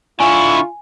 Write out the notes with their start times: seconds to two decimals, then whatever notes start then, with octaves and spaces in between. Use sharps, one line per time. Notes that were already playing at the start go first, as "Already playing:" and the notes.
0.20 D3 E4 F4 G#5 C#6